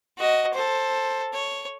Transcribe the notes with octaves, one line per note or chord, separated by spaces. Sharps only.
F#4 D#5
A4 C5
C#5